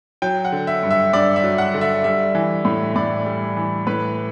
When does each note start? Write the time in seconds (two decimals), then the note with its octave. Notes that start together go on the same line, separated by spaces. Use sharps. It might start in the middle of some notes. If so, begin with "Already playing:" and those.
0.22 F#3 G5
0.45 F#5
0.52 D3
0.67 E5
0.83 G2
0.91 E5
1.13 G2 D5
1.36 E5
1.44 F#3
1.58 F#5
1.74 D3
1.81 E5
2.04 G3 E5
2.35 E3
2.65 A2
2.96 A2 D5
3.26 G3
3.57 E3
3.87 A2 B4